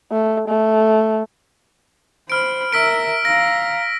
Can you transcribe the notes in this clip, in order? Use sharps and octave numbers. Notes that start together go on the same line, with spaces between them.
A3
A3
C5 B5 F6 D7
A#4 E5 E6 B6 D7
F5 A#5 A#6